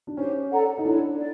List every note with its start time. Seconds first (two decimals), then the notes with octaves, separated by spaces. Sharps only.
0.07 D4
0.17 C#4 D#4 G4 C5
0.51 A4 D5 F#5 A#5
0.78 D#4
0.85 D4 E4 A4 C#5
1.18 D5